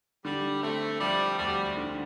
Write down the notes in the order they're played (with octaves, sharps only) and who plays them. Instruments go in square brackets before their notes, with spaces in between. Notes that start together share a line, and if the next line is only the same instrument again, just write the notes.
[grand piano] D3 [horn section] G3
[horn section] A3 [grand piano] C4
[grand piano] F3 [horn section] G3
[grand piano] D2 [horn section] G3
[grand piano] D3